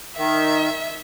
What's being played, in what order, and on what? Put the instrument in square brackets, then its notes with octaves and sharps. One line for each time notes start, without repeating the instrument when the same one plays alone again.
[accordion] D#3 [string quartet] E5